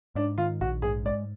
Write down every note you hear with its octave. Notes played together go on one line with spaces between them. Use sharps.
G#2 D4
D#3 F4
A#1 F#4
G#2 G#4
G#3 D5